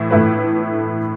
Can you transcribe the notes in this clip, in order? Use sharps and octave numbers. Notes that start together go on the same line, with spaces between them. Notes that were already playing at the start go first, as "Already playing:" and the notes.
Already playing: A2 E3 E4
A2 E3 A3 E4 B4